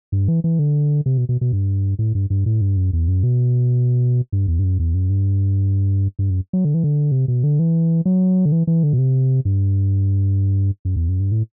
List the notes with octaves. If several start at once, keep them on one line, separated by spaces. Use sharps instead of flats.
G2
E3
E3
D3
C3
B2
B2
B2
G2
A2
G2
G2
A2
G2
F#2
E2
F#2
B2
G2
E2
G2
F#2
E2
F#2
G2
G2
F#2
F#3
D3
E3
D3
C3
B2
D3
E3
F#3
D3
E3
E3
D3
B2
C3
G2
F#2
E2
F#2
G2
A2